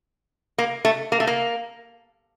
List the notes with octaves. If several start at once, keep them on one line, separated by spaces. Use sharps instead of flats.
A#3
A3
A#3
A3
A#3